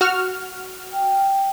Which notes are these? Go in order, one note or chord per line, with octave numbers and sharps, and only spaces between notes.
F#4 F6
G5